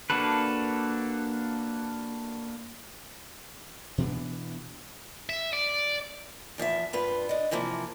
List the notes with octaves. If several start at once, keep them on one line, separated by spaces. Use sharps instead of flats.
A#3 D4 F#4 A4 B4
B2 E3 B3 D4
E5
D5
E2 F3 D#5 E5
G2 F4 B4
D4 D#5
C3 E3 F3 A#3